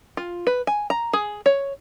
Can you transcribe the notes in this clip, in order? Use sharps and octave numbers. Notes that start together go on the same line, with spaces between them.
F4
B4
G#5
A#5
G#4
C#5